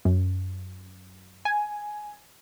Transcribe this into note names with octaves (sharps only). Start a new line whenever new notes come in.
F#2
G#5